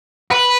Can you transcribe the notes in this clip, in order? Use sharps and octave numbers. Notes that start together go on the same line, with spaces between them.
B4